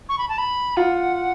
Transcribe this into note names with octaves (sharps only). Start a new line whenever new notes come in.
C#6
B5
A5
B5
F4 F#5